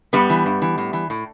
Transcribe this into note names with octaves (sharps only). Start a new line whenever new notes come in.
G2 G3 B3
E3
G2
E3
A2
E3
A2